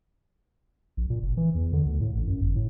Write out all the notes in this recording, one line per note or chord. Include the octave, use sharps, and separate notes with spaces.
A#1
A#2
F#1
E3
E2
D3
D2
A2
A1
F#2
G1
A2